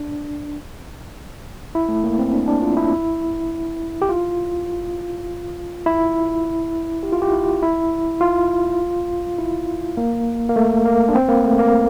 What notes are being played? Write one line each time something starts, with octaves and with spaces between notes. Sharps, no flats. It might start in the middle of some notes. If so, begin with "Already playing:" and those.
Already playing: D4
E4
A3
A#3
C4
D4
D4
F4
E4
G4
F4
E4
G4
F4
G4
E4
E4
F4
E4
A#3
A#3
A3
A#3
D4
C4
A#3
A3
A#3